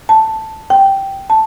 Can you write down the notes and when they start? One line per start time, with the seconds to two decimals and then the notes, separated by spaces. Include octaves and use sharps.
0.09 A5
0.70 G5
1.30 A5